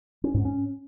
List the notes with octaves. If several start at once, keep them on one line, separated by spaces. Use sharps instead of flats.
C#4
G#2
C#4